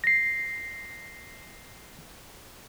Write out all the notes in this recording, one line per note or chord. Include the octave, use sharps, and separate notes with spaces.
A#6 C7